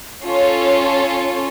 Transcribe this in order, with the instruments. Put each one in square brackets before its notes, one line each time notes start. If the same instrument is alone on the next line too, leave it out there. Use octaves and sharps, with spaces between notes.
[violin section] C#4 F4 A4 C#5